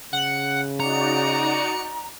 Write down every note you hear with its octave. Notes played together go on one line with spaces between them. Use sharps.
C#3 F#5
D#4 F#4 D5 A#5 C#7